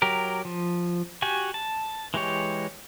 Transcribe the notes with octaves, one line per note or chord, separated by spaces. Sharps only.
F#3 G4 A#4
F3
F#4 G4 G#5
A5
E3 G#3 G4 C#5